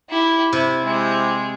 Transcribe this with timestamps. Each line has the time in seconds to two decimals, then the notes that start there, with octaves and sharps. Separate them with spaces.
0.10 E4 G4
0.53 C3 E4
0.85 G#3 E4 G4 C5